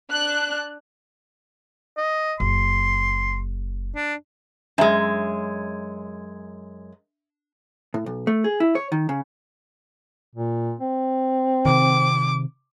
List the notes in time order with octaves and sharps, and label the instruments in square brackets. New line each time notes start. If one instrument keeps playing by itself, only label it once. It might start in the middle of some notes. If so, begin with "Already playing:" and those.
[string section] D4 F#6
[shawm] D#5
[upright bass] F#1 [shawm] C6
[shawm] D4
[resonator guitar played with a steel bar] F#2 G#3 [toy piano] D4 E5 A#5
[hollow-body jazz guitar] A2
B1
A3
G#4
E4
C#5
D#3
C#3
[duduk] A#2
C4
[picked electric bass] C3 D#3 [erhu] D6